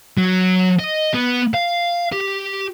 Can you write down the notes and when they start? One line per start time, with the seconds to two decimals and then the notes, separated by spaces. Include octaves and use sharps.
0.17 F#3
0.80 D#5
1.14 B3
1.54 F5
2.12 G4